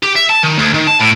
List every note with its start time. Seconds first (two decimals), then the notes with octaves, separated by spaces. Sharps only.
0.03 G4
0.16 E5
0.29 A5
0.43 D#3
0.59 D2
0.74 D#3
0.88 A5
1.01 A2